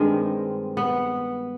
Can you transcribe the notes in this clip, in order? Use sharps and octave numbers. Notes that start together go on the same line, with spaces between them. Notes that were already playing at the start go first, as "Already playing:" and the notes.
Already playing: G2 D#3 G#3 C4
B3